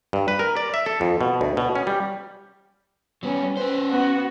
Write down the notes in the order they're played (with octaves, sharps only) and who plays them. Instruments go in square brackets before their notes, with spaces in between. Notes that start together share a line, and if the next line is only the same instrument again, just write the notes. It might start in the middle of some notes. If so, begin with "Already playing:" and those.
[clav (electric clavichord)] G2
B4
A#4
D5
E5
A4
F2
B2
D2
B2
C#4
G3
[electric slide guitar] F#3 G3 [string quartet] B3 C#4
[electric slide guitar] C#4 C5 [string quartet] B4
[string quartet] B3 F#4